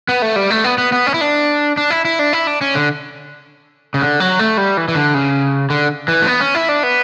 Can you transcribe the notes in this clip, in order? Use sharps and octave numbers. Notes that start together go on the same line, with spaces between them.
B3
A3
G3
A3
B3
B3
B3
C#4
E4
D4
D4
E4
E4
D4
E4
D4
C#4
D3
C#3
D3
F#3
A3
G3
E3
E3
D3
C#3
D3
E3
A3
B3
C#4
E4
D4
B3